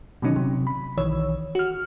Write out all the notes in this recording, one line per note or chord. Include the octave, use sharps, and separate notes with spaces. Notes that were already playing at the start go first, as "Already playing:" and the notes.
B2 D3 D#3 F#3 C#4 D#4
C3 F#3
B5
B1 D#3 E3 C#5 E6
F#4 F6